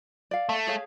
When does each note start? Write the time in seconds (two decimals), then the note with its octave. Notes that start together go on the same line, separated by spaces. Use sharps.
0.31 D5 F5
0.49 A3
0.67 G#4 C#5 F5